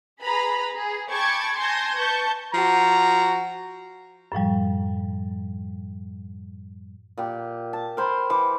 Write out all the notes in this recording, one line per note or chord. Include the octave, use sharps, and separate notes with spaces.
G#4 B4 A#5 B5
G#4
G5 A5 B5 C#6 D6 G#6
G#5 A5 C6 G6 G#6 A#6
B4 A5 C#6 G6
F3 F#4 A#5
F#2 A2 F3 G3
A#2 G4
A5
A#4 C5 B5
E3 B5 D6